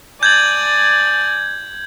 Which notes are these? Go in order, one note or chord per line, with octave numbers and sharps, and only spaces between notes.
D5 G#5 A5 G6 G#6 F#7